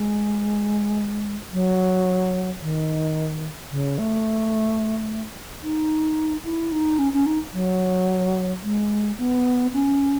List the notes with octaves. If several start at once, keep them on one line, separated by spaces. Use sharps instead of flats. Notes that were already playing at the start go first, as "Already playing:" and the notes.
Already playing: G#3
F#3
D#3
C#3
A3
D#4
E4
D#4
C#4
C#4
D#4
F#3
G#3
B3
C#4